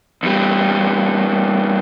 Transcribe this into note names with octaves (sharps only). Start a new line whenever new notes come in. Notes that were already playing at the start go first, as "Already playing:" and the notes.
E2 G3